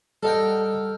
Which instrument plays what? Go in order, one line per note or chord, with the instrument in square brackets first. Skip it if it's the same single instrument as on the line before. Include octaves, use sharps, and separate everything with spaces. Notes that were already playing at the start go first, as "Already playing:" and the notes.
[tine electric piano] G3 D#5 F#5 [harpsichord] A4 A#4 G5